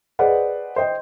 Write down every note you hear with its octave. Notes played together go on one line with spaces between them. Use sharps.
G#4 B4 C5 D5 D#5 F#5
C5 D#5 G5